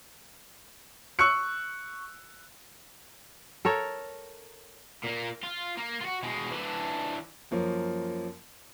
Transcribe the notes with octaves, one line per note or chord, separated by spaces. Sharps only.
C#6 E6 F#6 C#7
A4 A#4 C#5
A#2 A#3
F4
A#3
F4 F#4
B2 G#3
E3 D4
F#2 F3 A#3 C#4